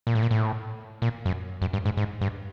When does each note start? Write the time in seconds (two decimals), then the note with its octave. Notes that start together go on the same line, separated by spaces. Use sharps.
0.07 A#2
0.15 A2
0.22 A#2
0.31 A2
1.02 A#2
1.26 F#2
1.62 F#2
1.73 G2
1.85 G#2
1.97 G#2
2.21 G2